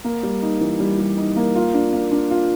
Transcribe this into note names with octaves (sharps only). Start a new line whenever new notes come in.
A#3
G3
D#4
E3
G3
G3
D#4
A#3
F4
D4
A#3
D4
F4